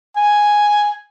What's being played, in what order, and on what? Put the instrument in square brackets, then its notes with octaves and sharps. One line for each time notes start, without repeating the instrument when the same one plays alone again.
[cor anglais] G#5